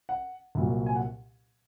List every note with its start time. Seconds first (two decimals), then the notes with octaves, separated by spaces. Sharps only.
0.09 F#5
0.55 C2 A#2 F#3
0.86 G#5
0.96 F#5